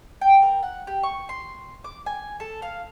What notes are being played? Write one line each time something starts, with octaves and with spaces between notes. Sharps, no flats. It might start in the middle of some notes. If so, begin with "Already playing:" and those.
G5
A#4
F#5
G4
C#6
C6
D6
G#5
A4
F5